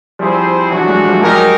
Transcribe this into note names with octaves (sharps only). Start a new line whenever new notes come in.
F3 G3 C4 E4 G#4 C5
E3 F#3 A3 D4 F#4
F#3 G#3
F3 G3
F#3 G#3 D#4 G4 A#4